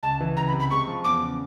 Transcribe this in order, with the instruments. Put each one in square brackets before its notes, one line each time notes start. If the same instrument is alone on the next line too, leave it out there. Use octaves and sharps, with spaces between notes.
[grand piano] C#2 [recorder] A5
[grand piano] E3
[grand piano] C#2 [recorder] A#5
[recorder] B5
[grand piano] C3
[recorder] B5
[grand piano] G#3 [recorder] C#6
[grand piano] F3
[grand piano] E2 [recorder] D6
[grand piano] C#3